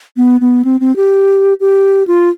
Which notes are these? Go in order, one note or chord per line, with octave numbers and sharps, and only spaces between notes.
B3
B3
C4
C4
G4
G4
F4